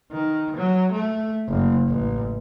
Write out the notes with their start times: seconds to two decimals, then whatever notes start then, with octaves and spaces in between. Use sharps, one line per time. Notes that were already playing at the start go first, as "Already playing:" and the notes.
0.12 D#3
0.56 F#3
0.92 A3
1.48 F#1
1.88 A1